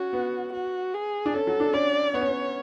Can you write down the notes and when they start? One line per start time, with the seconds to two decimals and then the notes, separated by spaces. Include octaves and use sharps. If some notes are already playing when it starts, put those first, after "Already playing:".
Already playing: C#4 F#4
0.13 B3
0.53 F#4
0.94 G#4
1.26 D4
1.34 C#4 A4
1.47 F#3
1.60 D4
1.73 C#4 D5
2.14 B3 C#5
2.21 C#4
2.28 B3